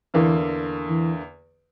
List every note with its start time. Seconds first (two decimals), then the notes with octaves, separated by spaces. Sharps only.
0.14 E2 D3 E3 A#3
0.89 E3